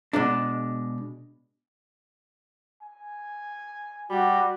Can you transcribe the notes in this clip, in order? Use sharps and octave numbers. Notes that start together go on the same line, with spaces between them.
B2 G#3 D4
G#5
G3 F#4